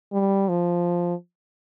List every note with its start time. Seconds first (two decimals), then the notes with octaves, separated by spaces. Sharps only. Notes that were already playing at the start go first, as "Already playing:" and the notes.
0.13 G3
0.49 F3